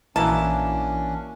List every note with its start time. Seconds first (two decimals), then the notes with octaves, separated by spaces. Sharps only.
0.16 A#1 E3 A#3 C#4 D4 E4 F#4 A5